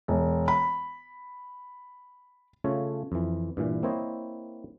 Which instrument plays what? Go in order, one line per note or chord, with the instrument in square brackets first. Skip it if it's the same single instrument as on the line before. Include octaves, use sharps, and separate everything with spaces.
[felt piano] E1
B5
[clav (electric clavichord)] C#3 A3 F4 A4 C#5
F2 E3
G2 A#2 E3
A#3 C4 E4 C5 C#5 D#5